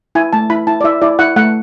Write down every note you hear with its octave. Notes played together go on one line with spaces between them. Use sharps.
E4 G#5
A3 A5
E4 B5
E4 A5
D5
E4 E5
E4 D5
E4 F#5
A3 F#5